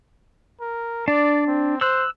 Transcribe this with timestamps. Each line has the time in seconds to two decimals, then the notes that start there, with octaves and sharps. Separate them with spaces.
0.61 A#4
1.08 D4 D5
1.47 C4
1.81 C5 E6 F#6